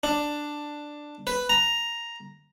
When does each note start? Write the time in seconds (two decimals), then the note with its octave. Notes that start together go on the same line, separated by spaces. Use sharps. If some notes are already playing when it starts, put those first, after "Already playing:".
0.03 D4
1.27 B4
1.50 A#5